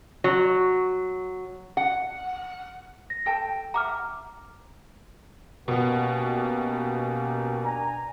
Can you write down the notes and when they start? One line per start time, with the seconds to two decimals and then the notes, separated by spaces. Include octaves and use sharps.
0.24 F#3
1.77 F#5
3.10 A#6
3.26 A4 G5 A5
3.74 E5 F#5 A#5 D6 F6
5.68 B2 A#3 B3 C#4 G4
7.64 D4 G#5 A#5